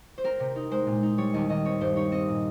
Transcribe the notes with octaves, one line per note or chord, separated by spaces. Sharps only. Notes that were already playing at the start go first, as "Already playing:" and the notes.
C5
C4 A#4
C3
D#4
G#3 C5
A#2
D#4
G3 C#5
D#2 D#5
D#2 D#5
C4 C#5
G2 C5
D#4 C#5
C4 D#5
A#2